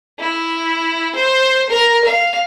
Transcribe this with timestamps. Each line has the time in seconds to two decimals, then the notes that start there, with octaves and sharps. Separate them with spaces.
0.20 E4
1.16 C5
1.70 A#4
2.05 F5